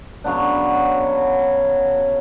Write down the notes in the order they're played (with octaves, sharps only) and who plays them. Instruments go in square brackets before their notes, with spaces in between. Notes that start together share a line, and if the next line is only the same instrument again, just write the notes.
[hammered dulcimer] C#3 F#3 B3 D4